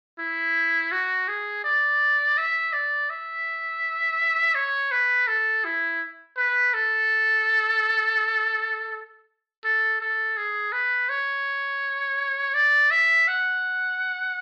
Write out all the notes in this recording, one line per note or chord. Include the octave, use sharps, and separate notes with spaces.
E4
F#4
G#4
D5
E5
D5
E5
C#5
B4
A4
E4
B4
A4
A4
A4
G#4
B4
C#5
D5
E5
F#5